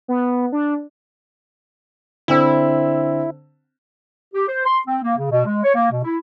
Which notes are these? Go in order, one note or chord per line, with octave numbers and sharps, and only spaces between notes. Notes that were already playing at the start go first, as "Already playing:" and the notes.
B3
D4
D3 C4 E4 E6
G4
C5
C6
C4
A#3
C#3
B2
G#3
C#5
A#3
B2
E4